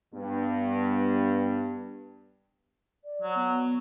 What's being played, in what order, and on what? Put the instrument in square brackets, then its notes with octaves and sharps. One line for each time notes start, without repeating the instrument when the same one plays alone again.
[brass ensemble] G2 [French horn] B3
[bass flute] D5
[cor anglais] F#3
[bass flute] B3